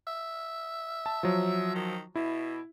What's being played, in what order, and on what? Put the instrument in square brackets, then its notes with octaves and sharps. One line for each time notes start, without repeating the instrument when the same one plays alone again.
[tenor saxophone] E5
[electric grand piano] A5
F3 F#3
[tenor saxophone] D#3
[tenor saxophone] B2 [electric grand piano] E4